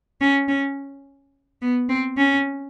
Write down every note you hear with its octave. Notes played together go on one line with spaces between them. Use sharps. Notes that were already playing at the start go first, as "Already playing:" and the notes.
C#4
C#4
B3
C4
C#4